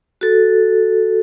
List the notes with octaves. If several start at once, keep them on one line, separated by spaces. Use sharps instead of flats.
F#4 A4